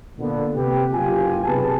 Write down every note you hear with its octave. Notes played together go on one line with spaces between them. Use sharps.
A#2 D3 B3
C3 G4 B4
F#1 F4 G4 G#5
B1 C3 B3 G#4 B4 A5